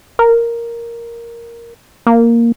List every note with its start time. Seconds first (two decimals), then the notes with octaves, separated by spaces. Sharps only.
0.19 A#4
2.07 A#3